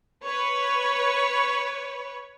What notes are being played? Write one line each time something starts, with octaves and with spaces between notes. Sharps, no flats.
B4 C#5